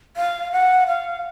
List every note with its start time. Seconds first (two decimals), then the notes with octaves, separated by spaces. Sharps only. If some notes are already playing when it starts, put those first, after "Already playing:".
0.17 F5
0.52 F#5
0.87 F5